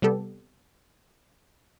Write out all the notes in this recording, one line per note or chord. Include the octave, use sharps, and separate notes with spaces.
C3 G3 B3 G4 A4